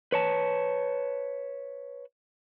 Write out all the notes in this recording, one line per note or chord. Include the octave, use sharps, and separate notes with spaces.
B4 C#5 A5